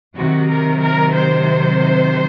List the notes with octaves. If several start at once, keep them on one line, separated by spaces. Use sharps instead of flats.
C3 D#3 F#3 F#4
A#4
A#4
C5